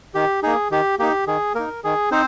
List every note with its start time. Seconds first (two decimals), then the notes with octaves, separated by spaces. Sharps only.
0.15 D#3 G4
0.43 A#3 D#4 G#4
0.71 D#3 G4
0.99 A#3 D#4 G4
1.27 D#3 G#4
1.55 A#3 D#4 A#4
1.84 D#3 G#4
2.11 C4 D#4 C5